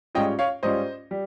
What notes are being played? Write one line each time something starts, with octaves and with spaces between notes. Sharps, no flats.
G#2 G3 C#4 F4 D#5 G5
C#5 F5
G#2 G3 C#4 F4 C5 D#5
G3